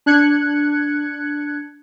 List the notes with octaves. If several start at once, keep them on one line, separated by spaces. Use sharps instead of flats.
D4 F#6 G#6 C#7